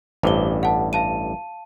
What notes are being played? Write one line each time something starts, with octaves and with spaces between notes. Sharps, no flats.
A1 G2 C5 D6 G7
F#5 A5
F5 A5 D#7